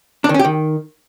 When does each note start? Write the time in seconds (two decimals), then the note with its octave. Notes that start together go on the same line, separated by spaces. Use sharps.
0.24 D4
0.29 D#3
0.34 C#4
0.39 G4
0.45 D#3